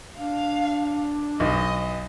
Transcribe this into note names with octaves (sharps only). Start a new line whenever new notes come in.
D4 F5
B1 D#5